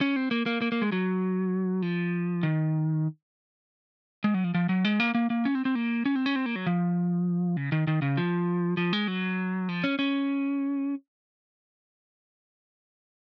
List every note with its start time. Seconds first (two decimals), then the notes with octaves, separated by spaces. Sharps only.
0.01 C#4
0.16 C4
0.31 A#3
0.46 A#3
0.62 A#3
0.72 A#3
0.82 G#3
0.92 F#3
1.82 F3
2.43 D#3
4.24 G#3
4.34 F#3
4.44 F3
4.54 F3
4.69 F#3
4.85 G#3
5.00 A#3
5.15 A#3
5.30 A#3
5.45 C#4
5.55 C4
5.65 C4
5.75 A#3
6.06 C#4
6.15 C4
6.26 C#4
6.36 C4
6.46 A#3
6.56 F#3
6.66 F3
7.57 C#3
7.72 D#3
7.87 D#3
8.02 C#3
8.17 F3
8.77 F3
8.93 G#3
9.08 F#3
9.69 F3
9.84 C#4
9.99 C#4